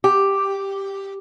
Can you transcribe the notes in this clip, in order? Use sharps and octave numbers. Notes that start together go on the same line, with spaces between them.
G4